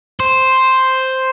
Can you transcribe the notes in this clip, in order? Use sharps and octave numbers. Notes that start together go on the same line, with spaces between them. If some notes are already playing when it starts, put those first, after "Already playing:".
C5